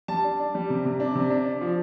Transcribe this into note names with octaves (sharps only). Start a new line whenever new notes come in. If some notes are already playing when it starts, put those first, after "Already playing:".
G3 A5
D4
D4
G3
C3
C3
D4
C3
D4
D4
F3